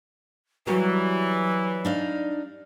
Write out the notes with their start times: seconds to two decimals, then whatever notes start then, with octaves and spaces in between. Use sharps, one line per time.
0.67 E3 F#3 G3 F#4 A#4
1.85 D4 D#4 F5